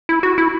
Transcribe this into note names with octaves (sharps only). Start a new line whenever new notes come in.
E4
F#4
E4